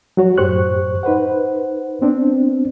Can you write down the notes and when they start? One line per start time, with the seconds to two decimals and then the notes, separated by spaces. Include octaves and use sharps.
0.17 F#3 F#4 C#5
0.38 F#2 A2 G4 C5 C#6 F#6
1.03 D#4 B4 C5 F#5
2.01 B3 C4 D4